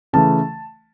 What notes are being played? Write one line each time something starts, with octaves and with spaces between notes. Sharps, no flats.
C#3 E3 A3 A5